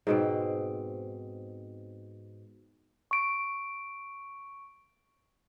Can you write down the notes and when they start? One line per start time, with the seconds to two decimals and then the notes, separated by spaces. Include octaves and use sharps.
0.07 G#2 B2 C4
3.11 C#6 D7